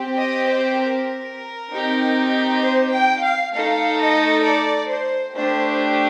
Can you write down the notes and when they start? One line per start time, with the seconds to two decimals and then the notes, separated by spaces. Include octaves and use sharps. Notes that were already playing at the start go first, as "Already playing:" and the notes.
Already playing: C4 G4
0.19 D#5
0.50 C5
0.80 A#4
1.72 C4 D#4 G4
2.63 C5
2.93 G5
3.24 F5
3.53 A3 D#4 A4 F5
3.99 D#5
4.45 D5
4.90 C5
5.37 A3 D4 G4 C5